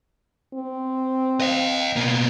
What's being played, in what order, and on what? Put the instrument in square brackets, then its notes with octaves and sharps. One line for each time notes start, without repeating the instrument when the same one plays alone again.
[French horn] C4
[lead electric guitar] D#5 F5
B2 A#3